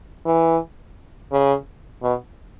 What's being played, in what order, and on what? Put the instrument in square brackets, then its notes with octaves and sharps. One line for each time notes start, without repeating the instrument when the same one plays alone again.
[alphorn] E3
C#3
B2